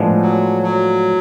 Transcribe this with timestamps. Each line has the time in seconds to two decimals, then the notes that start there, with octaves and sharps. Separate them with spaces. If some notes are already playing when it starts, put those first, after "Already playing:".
Already playing: A2 F3 G#3 B3 D4
0.22 F#3
0.63 F#3